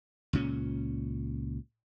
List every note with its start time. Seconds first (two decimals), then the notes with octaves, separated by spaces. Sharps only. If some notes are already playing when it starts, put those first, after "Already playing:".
0.33 C#2 A#2 C#4